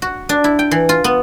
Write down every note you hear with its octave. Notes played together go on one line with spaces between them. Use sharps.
F#4
D4
E4
G5
E3
F4
B3